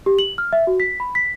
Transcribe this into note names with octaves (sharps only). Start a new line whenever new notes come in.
G4
F#7
F6
E5
F#4
B6
B5
B6